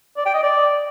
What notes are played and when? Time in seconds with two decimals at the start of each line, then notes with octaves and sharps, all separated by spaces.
0.17 D5
0.26 G5
0.34 D#5
0.43 D5